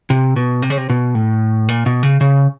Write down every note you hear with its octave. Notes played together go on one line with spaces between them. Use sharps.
C3
B2
C3
C#3
C3
B2
A2
A#2
B2
C#3
C#3